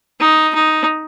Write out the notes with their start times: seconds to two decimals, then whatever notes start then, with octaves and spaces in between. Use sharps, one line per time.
0.20 D#4
0.54 D#4